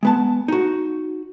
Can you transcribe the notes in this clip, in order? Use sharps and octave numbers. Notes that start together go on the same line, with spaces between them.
G#3 B3 A5
D#4 F#4